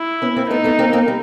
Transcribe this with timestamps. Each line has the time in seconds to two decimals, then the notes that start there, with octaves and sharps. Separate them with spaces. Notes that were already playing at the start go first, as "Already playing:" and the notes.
Already playing: E4
0.22 B3 C#4
0.36 A#3 C4
0.50 A3 B3 D#4
0.64 A3 B3
0.79 A#3 C4
0.93 A#3 C4
1.08 G3